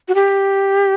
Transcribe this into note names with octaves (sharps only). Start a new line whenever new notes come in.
F#4
G4